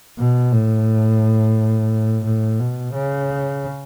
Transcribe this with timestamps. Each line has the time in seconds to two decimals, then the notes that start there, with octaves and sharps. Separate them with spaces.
0.19 B2
0.52 A2
2.24 A2
2.60 B2
2.94 C#3